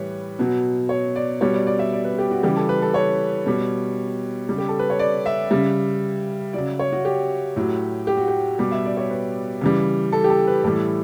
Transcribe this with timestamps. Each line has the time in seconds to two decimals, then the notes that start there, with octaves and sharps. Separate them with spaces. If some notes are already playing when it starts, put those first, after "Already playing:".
Already playing: A2 E3 G3 B4 C#5
0.39 B2 F#3
0.89 C#5
1.16 D5
1.41 B2 G3 C#5
1.54 D5
1.67 D5
1.79 E5
1.92 D5
2.05 B4
2.18 G4
2.31 F#4
2.43 C#3 E3 G3 G4
2.57 A4
2.69 B4
2.82 A4
2.94 C#5
3.46 B2 G3
4.49 C#3 G3
4.58 G4
4.69 A4
4.79 B4
4.90 C#5
4.99 D5
5.26 E5
5.51 C#3 G3
6.53 C#3 F#3 D5
6.79 C#5
6.92 F#4
7.05 G4
7.56 A2 F#3
8.07 G4
8.17 F#4
8.28 G4
8.59 B2 G3 G4
8.72 E5
8.85 D5
8.97 C#5
9.11 B4
9.61 C#3 E3 G3
10.12 A4
10.24 G4
10.30 A4
10.47 B4
10.64 A2 E3 G3 A4